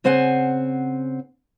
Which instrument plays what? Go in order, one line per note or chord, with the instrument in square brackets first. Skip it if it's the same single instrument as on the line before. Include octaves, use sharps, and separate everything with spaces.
[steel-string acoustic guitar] C#3 C4 C5 F#5 G#5